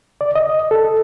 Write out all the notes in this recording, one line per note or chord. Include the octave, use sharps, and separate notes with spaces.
D5
D#5
A4